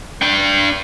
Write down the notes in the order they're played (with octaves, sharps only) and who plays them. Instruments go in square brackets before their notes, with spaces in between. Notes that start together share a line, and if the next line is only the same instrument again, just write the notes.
[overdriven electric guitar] D4 G5